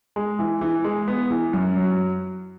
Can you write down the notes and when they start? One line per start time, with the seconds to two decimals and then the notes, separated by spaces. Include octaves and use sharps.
0.16 G#3
0.39 E3
0.61 E3
0.84 G#3
1.08 B3
1.31 E3
1.53 F#2
1.77 F#3